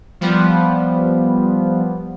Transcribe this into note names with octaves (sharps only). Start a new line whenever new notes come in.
F3 G3 B3